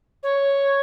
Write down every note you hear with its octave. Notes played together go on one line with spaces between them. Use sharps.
C#5